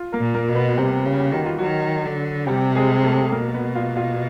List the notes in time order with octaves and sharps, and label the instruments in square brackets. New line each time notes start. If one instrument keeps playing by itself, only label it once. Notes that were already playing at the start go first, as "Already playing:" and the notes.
Already playing: [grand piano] F4
A#3 A#4
[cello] A#2
[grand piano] A#3 A#4
[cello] B2
[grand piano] B3 B4
[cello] C3 [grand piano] G3 G4
[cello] C#3
[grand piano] G4
[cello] D#3 [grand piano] F#4
[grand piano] F4
[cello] D#3 [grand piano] F#3 F#4
[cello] D3
[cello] C3 [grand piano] G3 G4
[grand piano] G#3 G#4
A3 A4
[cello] B2 [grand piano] A#3 A#4
[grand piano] A#4
B3 B4
F4 F5
F4 F5